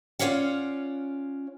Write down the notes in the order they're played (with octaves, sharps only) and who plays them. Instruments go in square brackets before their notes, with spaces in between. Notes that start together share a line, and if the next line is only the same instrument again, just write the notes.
[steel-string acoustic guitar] C#4 F4 C#5 D5 F5 F#5